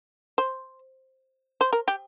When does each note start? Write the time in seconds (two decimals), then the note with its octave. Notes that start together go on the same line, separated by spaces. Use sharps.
0.38 C5
1.61 C5
1.73 A#4
1.88 G4